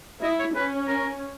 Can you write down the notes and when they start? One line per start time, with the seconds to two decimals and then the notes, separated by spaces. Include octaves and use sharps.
0.22 E4 D#5
0.39 C#5
0.55 C#4 B4
0.88 A#4